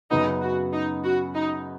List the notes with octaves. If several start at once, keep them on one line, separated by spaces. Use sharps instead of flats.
F#2 C#3 B3 D#4
F#4
D#4
F#4
D#4